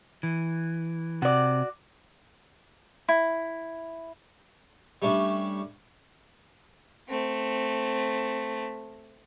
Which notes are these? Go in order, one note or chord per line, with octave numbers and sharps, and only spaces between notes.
E3
C3 F#4 D5
E4
G3 A3 C#4 D4
A3 C4